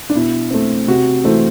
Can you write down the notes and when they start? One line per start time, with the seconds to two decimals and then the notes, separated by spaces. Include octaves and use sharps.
0.10 D4
0.15 B2 E4
0.51 A3 C4
0.88 C3 F#4
1.24 E3 A3 C4